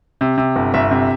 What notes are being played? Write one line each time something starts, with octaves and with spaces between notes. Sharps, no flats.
C3
C3
G1
G1 E5
C3